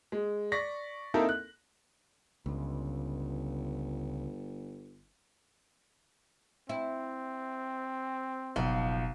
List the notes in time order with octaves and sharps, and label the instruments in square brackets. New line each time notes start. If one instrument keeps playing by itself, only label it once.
[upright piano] G#3
D5 C#6 A#6 B6
A#3 C4 D#4 E4 A4 A#4
F#6
[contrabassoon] G1 [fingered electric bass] C#2
[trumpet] C4 [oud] E4
[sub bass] F#1 [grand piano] B1 [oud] F3